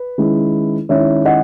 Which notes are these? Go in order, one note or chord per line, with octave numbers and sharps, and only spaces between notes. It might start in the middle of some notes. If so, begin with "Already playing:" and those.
Already playing: B4
D#3 G#3 C#4 E4
D#3 G#3 C#4 E4 C#5 E5
D#5 F#5